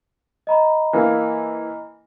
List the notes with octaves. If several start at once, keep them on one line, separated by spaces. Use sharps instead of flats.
D#5 A#5 B5
E3 A#3